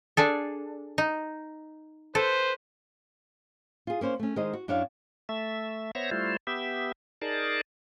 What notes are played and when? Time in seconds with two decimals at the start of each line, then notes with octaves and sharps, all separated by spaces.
0.17 D4 G#4 A4
0.98 D#4
2.15 A4 B4 C5
3.87 F4 G#4
4.01 A#3 C#4 C5 C#5
4.19 A3 C#4
4.36 D#3 G#3 C5 C#5 D#5
4.53 F#4
4.68 F#2 D4 E4 C#5 F5
5.29 A3 E5
5.95 B3 C5 C#5 E5 A#6
6.11 G3 A3 E4 F4 C5
6.47 B3 G4 E5
7.22 D#4 G#4 A#4 D5 A5